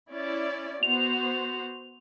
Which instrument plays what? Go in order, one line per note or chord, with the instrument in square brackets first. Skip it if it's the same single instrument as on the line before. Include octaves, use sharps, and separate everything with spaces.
[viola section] C#4 E4 D5
[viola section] B3 F#4 C5 [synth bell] F7